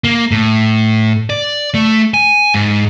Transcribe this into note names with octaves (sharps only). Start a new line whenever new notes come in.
A#3
A2
D5
A3
G#5
G#2